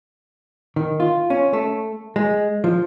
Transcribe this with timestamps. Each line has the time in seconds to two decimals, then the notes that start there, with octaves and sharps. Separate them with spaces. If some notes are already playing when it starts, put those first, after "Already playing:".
0.76 D#3
1.00 F4
1.30 C#4
1.53 A3
2.16 G#3
2.64 F3